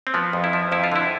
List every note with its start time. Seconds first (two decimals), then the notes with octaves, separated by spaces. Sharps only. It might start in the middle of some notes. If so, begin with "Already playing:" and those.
0.07 C4
0.14 F3 B3
0.33 F2
0.44 E4
0.53 F3
0.72 F2 E4
0.84 F4
0.92 D3 E4